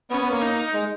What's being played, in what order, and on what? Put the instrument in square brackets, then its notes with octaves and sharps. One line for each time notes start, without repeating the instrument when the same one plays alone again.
[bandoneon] B3 [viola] C#4
[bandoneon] B3
A#3
[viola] D#4
[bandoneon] G#3